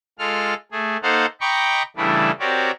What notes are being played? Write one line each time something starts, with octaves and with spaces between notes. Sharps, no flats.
G#3 F4 A4 F6
A3 G#4
A#3 D#4 A4 C5 F5 F#5
D#5 G5 A#5 B5 C#6 D6
C#3 E3 G3 A3 D4 E4
C4 F#4 G4 A#4 C#5 D5